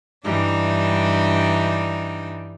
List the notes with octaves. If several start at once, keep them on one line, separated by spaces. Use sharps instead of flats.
G2 E3 G3 D4 D#4